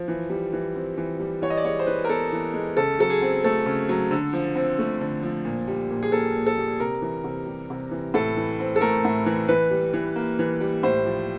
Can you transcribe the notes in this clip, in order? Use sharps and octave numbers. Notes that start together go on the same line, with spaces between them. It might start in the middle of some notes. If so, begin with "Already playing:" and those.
Already playing: F3
E3
G3
E3
C4
E3
G3
E3 C#5
D#5
D5
G#3 C#5
C5
E3 B4
A#4
B3 A4
E3
G#3
C#3 A4
F#3 A4
G#4
C4
A3 A4
C#3
F#3
D3
F3
C4
A3
D3
F3
A#2
G3
A#2
G#4
A#3 A4
A#2
A4
G3
C3 A#4
E3
C3
G3
C3
E3
A2 A4
E3
C4
A4
A3 A#4
A2
E3
E3 B4
G3
E3
A#3
E3
G3
A2 C5
F3